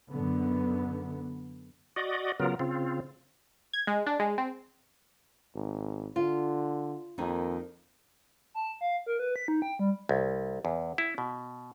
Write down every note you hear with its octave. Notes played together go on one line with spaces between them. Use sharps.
F#2 D3 B3
F#4 D5 D#5
C#3 F#3 B3 F4 A#4
C#3 C4 F4
G#6
G#3
D4
G#3
C4
G#1
D3 F4
F2 D#3 A#3 D#4
A5
F5
A#4
B4
B6
D#4
G5
G3
C2
E2
E4
B2